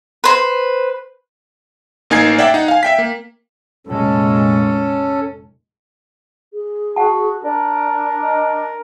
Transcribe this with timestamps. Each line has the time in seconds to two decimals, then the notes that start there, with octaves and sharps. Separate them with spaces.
0.24 B4 C5
2.10 A1 A#3 D#4 G#5 G#6 C7
2.39 D5 E5 F#5 G5
2.54 D#4 F#5
2.68 F5 G#5
2.83 E5 G5 B6
2.98 A#3
3.87 F1 A#2 G#3 C#4 A4
6.53 G#4
6.96 F#4 F#5 A5
7.44 D4 A#4 D5
8.23 D#5